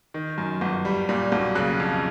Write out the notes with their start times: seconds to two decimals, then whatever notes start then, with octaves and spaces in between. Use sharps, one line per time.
0.14 D#3
0.38 F#2
0.61 G1
0.85 G3
1.09 A#2
1.32 B1
1.55 C#3 F#6
1.80 F2